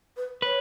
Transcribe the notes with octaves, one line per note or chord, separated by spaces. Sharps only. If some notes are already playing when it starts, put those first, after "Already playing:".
B4
B4 C#5